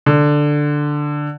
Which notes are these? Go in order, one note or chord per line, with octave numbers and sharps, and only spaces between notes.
D3